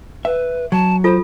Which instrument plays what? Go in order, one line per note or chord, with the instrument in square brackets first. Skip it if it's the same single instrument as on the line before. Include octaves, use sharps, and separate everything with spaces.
[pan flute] B4 [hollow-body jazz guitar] E5
[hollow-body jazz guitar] F#3 [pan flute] A5
[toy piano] F4 A4 [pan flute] C5